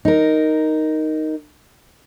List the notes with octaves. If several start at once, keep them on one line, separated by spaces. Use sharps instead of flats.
D#4 A#4